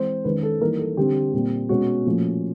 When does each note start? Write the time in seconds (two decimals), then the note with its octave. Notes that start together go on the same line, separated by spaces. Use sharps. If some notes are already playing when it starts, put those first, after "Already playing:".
Already playing: E3 G#3 C4 C5
0.24 D#3 G#3 C#4 B4
0.43 A4
0.61 E3 G3 A#3 D#4 A#4
0.79 A4
0.97 D3 G3 C4 G4
1.33 A#2 G3 C4
1.69 B2 G#3 C#4 F#4
2.06 A#2 F3 A3 C#4